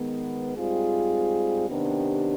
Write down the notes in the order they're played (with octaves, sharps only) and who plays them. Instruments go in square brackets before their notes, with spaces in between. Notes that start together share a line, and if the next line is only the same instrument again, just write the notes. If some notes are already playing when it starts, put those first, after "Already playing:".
Already playing: [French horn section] D#3 G#3 B3
G#2 G3 C4 F4 G#4
C3 D#3 B3 D4 G4